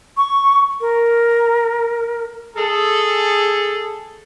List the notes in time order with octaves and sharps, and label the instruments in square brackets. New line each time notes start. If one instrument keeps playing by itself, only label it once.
[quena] C#6
A#4
[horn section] G#4 A4